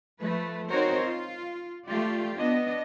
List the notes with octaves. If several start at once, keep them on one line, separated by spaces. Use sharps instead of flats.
F3 A3 B4
C4 D#4 F#4 A#4 C5 C#5
F4
A3 F4 G4 D5
B3 D4 D#5